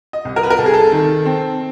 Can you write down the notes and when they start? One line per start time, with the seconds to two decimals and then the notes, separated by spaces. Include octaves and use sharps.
0.13 D#5
0.25 C2
0.36 A#4
0.43 B4
0.50 A#4
0.58 C2 A4
0.66 G#4
0.74 A4
0.92 D#3
1.25 C4